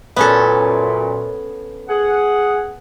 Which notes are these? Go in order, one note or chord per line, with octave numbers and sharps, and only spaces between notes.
F#2 A#2 B3 C#4 A4
G#4 F#5